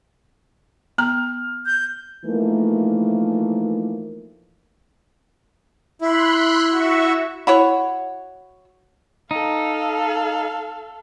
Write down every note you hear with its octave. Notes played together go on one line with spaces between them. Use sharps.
B3 A#5 F6
G6
E3 F3 A3 A#3 D#4 A#4
E4 B5 C6 F#6
F#4 E5 C#6
E4 F#4 C#5
D#4 A4 F5